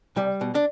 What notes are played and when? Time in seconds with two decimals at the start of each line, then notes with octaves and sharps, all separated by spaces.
0.16 C2 G3
0.41 B2
0.55 D4